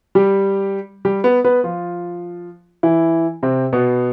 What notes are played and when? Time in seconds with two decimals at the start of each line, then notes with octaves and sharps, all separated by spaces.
0.15 G3 G4
1.05 G3 G4
1.24 B3 B4
1.44 B3 B4
1.64 F3 F4
2.83 E3 E4
3.43 C3 C4
3.73 B2 B3